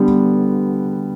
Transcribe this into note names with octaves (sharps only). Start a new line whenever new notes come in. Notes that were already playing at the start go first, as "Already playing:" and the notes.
Already playing: D3 G3 B3